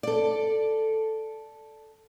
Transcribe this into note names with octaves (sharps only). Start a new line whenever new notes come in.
A4 D5